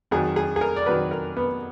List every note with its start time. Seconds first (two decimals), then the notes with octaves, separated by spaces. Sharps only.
0.11 F2 D#3 F#3 G#4
0.36 G#4
0.56 G#4
0.61 A#4
0.76 D5
0.86 F2 D#3 F#3 B4
1.11 A#4
1.37 B3